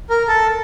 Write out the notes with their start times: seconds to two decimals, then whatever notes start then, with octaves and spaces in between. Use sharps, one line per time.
0.10 A#4
0.28 A4